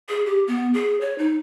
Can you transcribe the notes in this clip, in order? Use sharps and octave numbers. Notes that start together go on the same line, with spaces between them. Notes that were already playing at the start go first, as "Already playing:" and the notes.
G#4
G4
B3
G#4
C#5
D#4